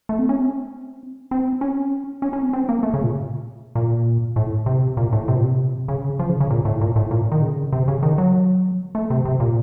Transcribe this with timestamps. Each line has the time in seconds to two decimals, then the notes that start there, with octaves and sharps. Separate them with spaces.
0.09 A3
0.19 C4
0.29 C#4
0.39 C4
1.31 C4
1.61 C#4
2.22 C#4
2.33 C#4
2.42 C4
2.53 C4
2.69 A#3
2.83 A3
2.94 C#3
3.03 A#2
3.75 A#2
4.36 A2
4.66 C3
4.97 A#2
5.13 A2
5.28 C3
5.36 A#2
5.44 C3
5.88 C#3
6.19 F3
6.29 C#3
6.41 C#3
6.51 A#2
6.65 A2
6.81 A#2
6.96 A2
7.11 A#2
7.32 D#3
7.42 C#3
7.73 C3
7.88 C#3
8.03 D#3
8.18 F#3
8.95 A3
9.10 C3
9.25 C3
9.40 A#2